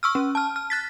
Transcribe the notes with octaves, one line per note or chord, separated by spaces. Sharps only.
C#6 E6 F6
C#4
A5 F6
F6
F#6 A6 B6